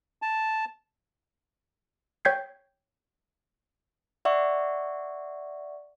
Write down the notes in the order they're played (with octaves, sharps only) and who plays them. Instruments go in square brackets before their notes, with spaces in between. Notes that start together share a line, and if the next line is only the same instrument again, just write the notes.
[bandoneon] A5
[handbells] C#5 G5 G6 G#6 B6 C7
[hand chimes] D5 E5 F#5 C#6